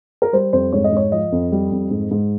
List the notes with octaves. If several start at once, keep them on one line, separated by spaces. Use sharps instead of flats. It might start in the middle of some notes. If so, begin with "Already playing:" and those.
A#4
G3 C5
F2 C5
G#2 C#5
D#5
G#2 C#5
F3 D#5
F2
G3
F2
G#2
G#2